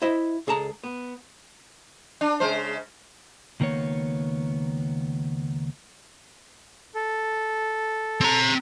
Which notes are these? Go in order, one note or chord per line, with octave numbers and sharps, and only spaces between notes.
E4 C5 D#5 E5
C#2 G#4 A4 A5 A#5
B3
D4
C#3 G#3 C5
C#2 D#3 A#3 B3 C#5
A4
C4 A#5